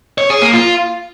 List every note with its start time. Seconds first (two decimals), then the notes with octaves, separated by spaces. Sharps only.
0.18 C#5
0.30 G#4
0.42 A#3
0.54 F4